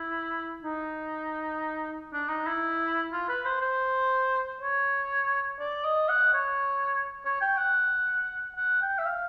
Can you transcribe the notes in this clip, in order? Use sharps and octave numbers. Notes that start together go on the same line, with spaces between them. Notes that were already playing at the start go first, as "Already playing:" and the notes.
Already playing: E4
D#4
D4
D#4
E4
F4
B4
C5
C5
C#5
D5
D#5
F#5
C#5
C#5
G5
F#5
F#5
G5
E5
F5